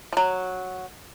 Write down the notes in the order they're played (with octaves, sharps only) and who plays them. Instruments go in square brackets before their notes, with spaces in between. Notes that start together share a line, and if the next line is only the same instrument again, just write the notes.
[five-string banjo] F3 F#3